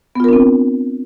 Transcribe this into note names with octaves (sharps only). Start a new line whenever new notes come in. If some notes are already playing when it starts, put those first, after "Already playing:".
B3 C4 D4 F4 A#4